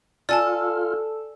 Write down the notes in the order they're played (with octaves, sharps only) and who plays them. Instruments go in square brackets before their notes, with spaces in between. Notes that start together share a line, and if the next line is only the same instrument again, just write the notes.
[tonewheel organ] F4 [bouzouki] A4 [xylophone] D5 G#5 A5